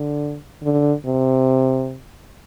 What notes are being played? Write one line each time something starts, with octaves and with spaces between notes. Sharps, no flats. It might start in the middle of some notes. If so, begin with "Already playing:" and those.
Already playing: D3
D3
C3